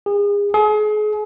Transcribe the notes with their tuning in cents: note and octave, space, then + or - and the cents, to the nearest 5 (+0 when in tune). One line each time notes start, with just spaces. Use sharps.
G#4 -35
G#4 +35